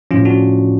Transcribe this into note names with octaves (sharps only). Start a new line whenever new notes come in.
A2 F3 C#4 F4
D4 F#4